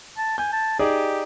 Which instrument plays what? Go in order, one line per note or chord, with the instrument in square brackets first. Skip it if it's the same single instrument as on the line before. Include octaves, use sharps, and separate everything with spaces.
[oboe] A5
[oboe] G#5 [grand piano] G6
[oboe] A5
[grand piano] D#4 G#4 D5 [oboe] G4